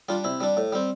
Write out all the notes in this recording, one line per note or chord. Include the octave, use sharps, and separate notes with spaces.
G3 D4 F4
C3 E4
G3 D4
A2
G3 C4